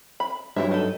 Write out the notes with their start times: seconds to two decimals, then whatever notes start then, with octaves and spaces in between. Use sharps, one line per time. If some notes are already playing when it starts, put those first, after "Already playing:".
0.20 B5
0.56 G2 E3 F#3 E4 E5
0.71 D#4 A4